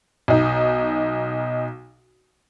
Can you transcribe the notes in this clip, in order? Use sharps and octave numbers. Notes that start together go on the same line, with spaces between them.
B1 D#4